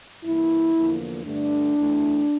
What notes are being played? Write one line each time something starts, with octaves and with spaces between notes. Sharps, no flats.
G2 E3 A#3 E4
E2 D3 F3 A#3
G2 D3 A3 D4
E2 E3 A3